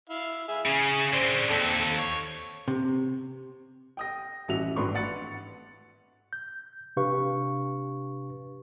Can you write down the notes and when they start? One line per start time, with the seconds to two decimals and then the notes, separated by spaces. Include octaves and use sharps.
0.10 E4 F5
0.48 G#4 E5
0.66 C#3 G#4
1.13 D3 C4 C5 D5
1.50 D#2 C4 A4
1.99 C#5
2.68 C3
3.97 G5 D#6 A#6
4.48 A1 E3 F#4 E5 F7
4.76 G#1 A2 D4 B4 C6 C#6
4.95 F#5 A6 C#7
6.33 G6
6.97 C3 D4 G4 B4 F5 C#6